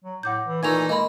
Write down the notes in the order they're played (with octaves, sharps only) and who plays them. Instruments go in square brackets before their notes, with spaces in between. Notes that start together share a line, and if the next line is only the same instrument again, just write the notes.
[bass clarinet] F#3
[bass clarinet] A2 [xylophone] F#5 D6 G6
[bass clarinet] E3
[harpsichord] A#2 E3 A3 [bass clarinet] D#4 [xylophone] G#6 F7
[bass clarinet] G#3 [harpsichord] A#3 [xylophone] D#5 B5